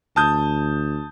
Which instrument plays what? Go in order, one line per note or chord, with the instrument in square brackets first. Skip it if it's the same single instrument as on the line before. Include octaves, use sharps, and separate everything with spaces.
[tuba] D2 [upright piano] A5 D#6 G6